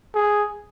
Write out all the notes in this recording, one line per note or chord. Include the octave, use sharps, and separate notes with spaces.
G#4